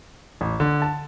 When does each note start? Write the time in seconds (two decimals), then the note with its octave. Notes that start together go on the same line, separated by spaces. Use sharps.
0.41 A1
0.60 D3
0.82 A5